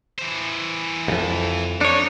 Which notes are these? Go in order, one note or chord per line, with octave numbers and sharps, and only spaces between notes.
E3 C5
C2 F2
D4 D#4 C#5